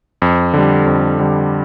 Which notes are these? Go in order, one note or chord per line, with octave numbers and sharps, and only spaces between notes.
F2
D3 G3
F2
D3 G3